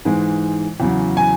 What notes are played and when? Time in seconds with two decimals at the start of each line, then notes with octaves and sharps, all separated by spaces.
0.05 G#2 E3 G#3
0.80 E2 C#3 F#3
1.17 G#5